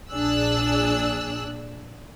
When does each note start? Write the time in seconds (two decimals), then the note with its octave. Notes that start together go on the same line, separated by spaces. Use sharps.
0.12 A#1 D4 G#4 E6 F#6